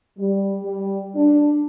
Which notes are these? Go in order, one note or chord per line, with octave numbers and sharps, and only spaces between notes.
G3
G3
D4